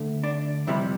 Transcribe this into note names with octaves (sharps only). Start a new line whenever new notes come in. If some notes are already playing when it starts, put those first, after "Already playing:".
Already playing: D2 D3 A3
D4
F2 C3 G3 E4